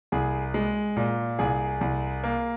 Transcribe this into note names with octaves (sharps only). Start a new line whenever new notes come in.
C2 G#4
G#3
A#2
C2 G#4
C2
A#3